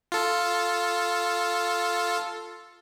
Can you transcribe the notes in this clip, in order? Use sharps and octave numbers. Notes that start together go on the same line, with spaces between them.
F4 A4